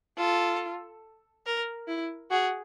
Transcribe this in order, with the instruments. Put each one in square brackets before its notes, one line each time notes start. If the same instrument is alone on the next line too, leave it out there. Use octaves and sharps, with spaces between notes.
[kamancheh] F4 [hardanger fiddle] A4
[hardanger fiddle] A#4
[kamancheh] E4
[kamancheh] F#4 [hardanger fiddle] G#4